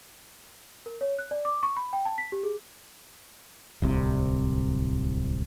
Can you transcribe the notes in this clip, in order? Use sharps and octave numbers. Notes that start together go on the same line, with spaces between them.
A#4
C#5
F#6
D5
D6
C#6
B5
G5
A5
B6
G4
G#4
D1 C2 C3